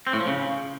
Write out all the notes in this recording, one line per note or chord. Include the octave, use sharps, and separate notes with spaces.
C4
A2
F3
C#3